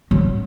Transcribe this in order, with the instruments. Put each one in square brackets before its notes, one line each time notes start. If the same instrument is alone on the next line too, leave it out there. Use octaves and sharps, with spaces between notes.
[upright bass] F#3